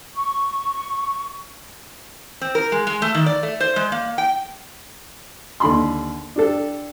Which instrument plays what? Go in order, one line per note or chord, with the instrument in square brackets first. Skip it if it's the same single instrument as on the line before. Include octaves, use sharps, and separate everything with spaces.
[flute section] C#6
[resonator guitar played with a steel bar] C4
A#4
G#3
G#3
A3
D#3
D5
A3
C5
G#3
A#3
G5
[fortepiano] D#2 D3 B5 C6
D4 G4 A4